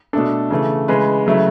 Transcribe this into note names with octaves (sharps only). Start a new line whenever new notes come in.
B2 A3 D4 A4
C#3 E3 A3
C#3 E3 G#3 B4
C#3 F#3 A3 E4